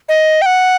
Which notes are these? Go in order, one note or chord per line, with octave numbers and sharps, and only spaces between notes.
D#5
G5
F#5